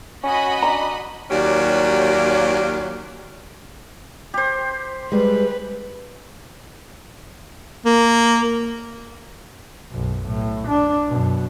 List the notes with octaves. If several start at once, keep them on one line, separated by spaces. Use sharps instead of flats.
C#4 F#4 D#5 B5
D4 A#5
D#2 F#3 C#4 F4 G4 D5
G4 C5
G3 G#3 B4
A#3
B1 F#2
A2
D4
F#2 B2